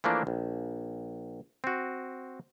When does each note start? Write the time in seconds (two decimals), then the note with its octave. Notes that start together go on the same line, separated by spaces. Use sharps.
0.04 E3 F3 A3 A#3 D4
0.27 A#1
1.64 C4 F#4